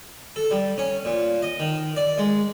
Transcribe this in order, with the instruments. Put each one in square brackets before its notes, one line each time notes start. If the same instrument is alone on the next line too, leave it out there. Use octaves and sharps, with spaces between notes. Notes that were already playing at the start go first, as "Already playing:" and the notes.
[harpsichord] A4
G3
C#4
A#2
D#5
D#3
D5
G#3